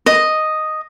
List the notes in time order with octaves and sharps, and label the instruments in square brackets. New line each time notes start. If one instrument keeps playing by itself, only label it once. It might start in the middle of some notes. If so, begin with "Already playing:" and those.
[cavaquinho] D#5